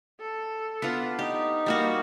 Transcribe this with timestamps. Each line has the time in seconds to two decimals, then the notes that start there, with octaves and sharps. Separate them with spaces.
0.21 A4
0.82 B3 D4 F4
1.19 D#4 G4
1.66 G3 A#3 F#4